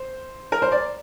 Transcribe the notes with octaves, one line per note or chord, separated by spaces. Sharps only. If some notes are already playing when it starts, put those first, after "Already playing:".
Already playing: C5
A#4
C5
D5